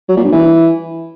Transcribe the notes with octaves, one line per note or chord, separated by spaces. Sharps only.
F#3
A#2
G2
E3